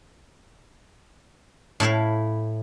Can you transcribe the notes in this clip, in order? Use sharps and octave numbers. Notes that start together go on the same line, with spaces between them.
A2 E4 E5 F5